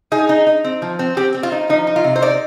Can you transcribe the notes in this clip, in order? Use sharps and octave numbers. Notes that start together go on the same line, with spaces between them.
D#4 G#4
D#4
D#4
C4
F3
C4
C4 G4
C4
F4
D#4
F3 D#4
D#4
F4
C3
C5
D#4 D5